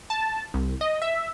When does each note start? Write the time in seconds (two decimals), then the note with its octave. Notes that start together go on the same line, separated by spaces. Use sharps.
0.10 A5
0.54 C2
0.81 D#5
1.02 E5